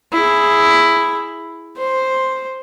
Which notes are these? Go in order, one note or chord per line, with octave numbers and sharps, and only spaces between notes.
E4 G#4
C5